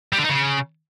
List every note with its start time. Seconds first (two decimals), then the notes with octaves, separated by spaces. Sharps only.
0.13 G3
0.18 D3
0.24 D#4
0.29 C#3